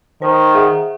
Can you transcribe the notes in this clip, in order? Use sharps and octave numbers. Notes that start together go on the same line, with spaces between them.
D#3 C5
G#4 E5 F#5